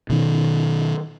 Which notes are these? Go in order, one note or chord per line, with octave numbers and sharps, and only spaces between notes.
B2 D#3